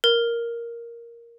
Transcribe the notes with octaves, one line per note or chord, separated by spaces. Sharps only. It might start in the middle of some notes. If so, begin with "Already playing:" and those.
A#4